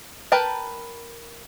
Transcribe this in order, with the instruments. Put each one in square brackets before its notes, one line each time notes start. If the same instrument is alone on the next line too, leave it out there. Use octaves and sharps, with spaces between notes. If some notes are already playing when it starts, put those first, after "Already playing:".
[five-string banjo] A#4 B4 G5 A5